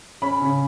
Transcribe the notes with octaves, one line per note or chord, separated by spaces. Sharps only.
C#4 B5
C#3